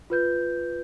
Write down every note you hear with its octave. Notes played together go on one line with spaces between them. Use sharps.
F4 B4 G6